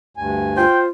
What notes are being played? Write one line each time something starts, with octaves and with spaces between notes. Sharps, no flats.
D2 G2 G#5
F4 C5 G5